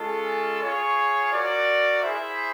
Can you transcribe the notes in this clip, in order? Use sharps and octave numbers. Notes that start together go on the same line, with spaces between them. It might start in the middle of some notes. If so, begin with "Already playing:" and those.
Already playing: G#3 C#4 F4 A4
F4 G#4 C#5
F#4 A#4 D5
E4 G#4 C5 E5